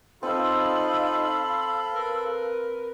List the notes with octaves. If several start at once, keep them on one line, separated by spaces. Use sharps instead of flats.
C4 D#4 F4 A4 F5 B5 E6
A#4 B4